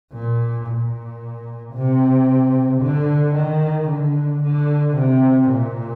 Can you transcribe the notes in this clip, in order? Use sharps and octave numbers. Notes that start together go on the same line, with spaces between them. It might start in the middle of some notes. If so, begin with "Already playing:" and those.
A#2
A#2
C3
D3
D#3
D3
D3
C3
A#2